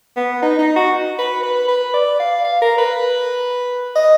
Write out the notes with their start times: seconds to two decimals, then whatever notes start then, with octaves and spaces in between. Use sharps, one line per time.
0.16 B3
0.42 D#4
0.58 D#4
0.76 F#4
1.18 B4
1.43 B4
1.68 B4
1.94 D5
2.20 F5
2.44 F5
2.62 A#4
2.78 B4
3.95 D#5